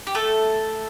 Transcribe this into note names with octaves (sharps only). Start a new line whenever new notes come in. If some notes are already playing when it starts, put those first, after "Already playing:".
G4
A3 A4